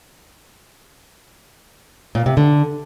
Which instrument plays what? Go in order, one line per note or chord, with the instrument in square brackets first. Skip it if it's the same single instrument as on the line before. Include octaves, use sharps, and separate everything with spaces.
[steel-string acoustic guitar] A#2
C3
D3